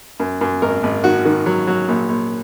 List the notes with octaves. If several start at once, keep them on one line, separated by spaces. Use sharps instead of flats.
F#2
F#2
G#1 A#4
G#1
D#3 F#4
D#3
F#3
F#3
A#1
A#1